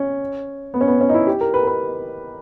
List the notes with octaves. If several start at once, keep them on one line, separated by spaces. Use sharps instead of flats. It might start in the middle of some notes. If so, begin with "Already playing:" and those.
Already playing: C#4
B3
C#4
B3
C#4
D#4
E4
G4
A#4
B4
A#4
B4